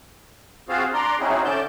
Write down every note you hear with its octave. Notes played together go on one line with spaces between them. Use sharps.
C4 F4 F#4 G#4 C5 F5
D4 D5 A#5 C6
C4 C#4 D#4 E4 F#4 G#4
D3 A3 C#4 D5 A5 G6